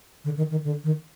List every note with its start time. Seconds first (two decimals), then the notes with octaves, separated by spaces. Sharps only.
0.25 D3
0.37 D#3
0.51 D#3
0.64 D3
0.84 D#3